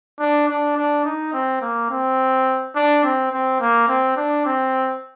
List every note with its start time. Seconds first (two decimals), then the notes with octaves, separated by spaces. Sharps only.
0.20 D4
0.49 D4
0.77 D4
1.05 D#4
1.34 C4
1.61 A#3
1.90 C4
2.75 D4
3.04 C4
3.32 C4
3.60 A#3
3.88 C4
4.17 D4
4.45 C4